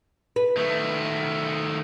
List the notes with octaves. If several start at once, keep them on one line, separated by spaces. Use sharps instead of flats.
B4
D#3 A3